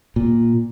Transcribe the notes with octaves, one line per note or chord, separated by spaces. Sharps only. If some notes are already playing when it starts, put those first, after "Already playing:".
A#2